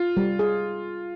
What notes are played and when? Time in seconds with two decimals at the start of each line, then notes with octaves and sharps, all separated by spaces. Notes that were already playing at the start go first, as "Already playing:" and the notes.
Already playing: F4
0.17 G3
0.39 G#4